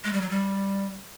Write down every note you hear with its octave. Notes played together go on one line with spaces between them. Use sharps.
G#3
G3
F#3
G3